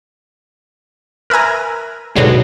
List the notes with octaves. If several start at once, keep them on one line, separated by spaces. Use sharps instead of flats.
A#4 B4 E5 G#5 A#5
G#2 B2 D3 F#3 G#3